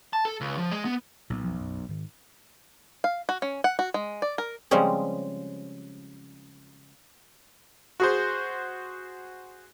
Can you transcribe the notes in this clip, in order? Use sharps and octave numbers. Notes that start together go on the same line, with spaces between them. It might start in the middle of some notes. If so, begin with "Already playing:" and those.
A5
A4
C#2
F3
G#3
B3
B1 A#2
F2 F3
F#2
G#2 D#3
F5
F#4
C#4
F#5
F#4
G#3
D5
A#4
C#3 F3 G3 G#3 C4 C#4
F#4 G#4 C5